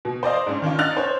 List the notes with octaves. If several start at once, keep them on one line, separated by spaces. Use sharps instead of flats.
B2
C5 D5 D#5 F5
G#2 C#4 D4
D#3 C#4 D4 F4
D4 D#4 F6 F#6 A6 F7
C5 C#5